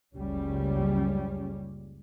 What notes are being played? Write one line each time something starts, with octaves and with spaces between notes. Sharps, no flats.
F#1 C#2 G3 C#4